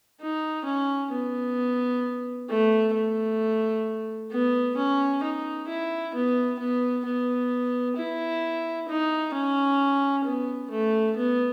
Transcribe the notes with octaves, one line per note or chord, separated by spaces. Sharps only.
D#4
C#4
B3
A3
A3
B3
C#4
D#4
E4
B3
B3
B3
E4
D#4
C#4
B3
A3
B3